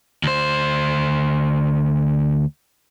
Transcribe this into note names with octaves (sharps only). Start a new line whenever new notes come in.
D2 C5